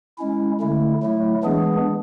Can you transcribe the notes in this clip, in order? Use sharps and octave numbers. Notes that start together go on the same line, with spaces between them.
G#3 C#4 E4
D3 A3 E4
F#3 A3 E4
E3 G#3 B3 D4 G#4